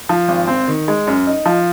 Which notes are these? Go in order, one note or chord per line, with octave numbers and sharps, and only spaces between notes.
F3
G#1
C4
D#3
G#3
F#2
D#4
F3